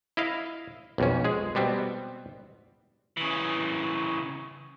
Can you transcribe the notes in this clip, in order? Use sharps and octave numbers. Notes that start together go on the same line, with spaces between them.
E4 D#5 F5
B1 F2 C#4
G#3 G#4
B2 G3 B3 C4
C#3 E3